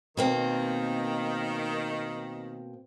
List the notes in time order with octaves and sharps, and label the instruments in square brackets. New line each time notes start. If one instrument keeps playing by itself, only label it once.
[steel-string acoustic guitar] B2 A#3 C4 [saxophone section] D#3